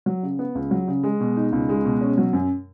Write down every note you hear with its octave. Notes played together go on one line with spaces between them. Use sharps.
F#3
C#3
B3
C#2
F#3
C#3
G#3
B2
D#4
C#2
G#3
B2
C#4
F#3
F#2